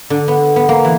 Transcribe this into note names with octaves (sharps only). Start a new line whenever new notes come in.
D3
B3
B3
A#3
E3